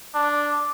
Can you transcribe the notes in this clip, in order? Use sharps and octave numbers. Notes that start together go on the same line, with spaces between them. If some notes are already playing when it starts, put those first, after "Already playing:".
D4